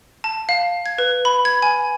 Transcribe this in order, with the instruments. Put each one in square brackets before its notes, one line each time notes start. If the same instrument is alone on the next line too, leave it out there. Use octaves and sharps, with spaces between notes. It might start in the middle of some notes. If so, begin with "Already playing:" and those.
[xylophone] A5
F5
G#6
B4
B5
G#6
G#5